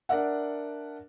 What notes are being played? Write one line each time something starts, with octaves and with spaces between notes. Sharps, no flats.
D4 A#4 D5 E5 F#5